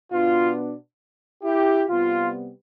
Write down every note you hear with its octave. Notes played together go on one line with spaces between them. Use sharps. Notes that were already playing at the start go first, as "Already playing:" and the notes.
B2 B3 D4 F4
E4 G4
C3 G3 B3 F4